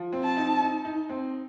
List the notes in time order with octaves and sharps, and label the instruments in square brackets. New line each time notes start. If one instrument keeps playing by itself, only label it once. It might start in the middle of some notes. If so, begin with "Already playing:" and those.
Already playing: [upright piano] F3
C4
[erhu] A5
[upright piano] D#4
D#4
D#4
C4